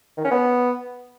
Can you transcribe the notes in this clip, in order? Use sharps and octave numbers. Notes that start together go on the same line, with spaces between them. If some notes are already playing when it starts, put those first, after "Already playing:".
D#3
C#4
B3